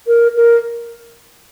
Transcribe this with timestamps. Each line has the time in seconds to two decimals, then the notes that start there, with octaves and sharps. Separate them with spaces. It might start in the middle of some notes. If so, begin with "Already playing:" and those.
0.07 A#4
0.37 A#4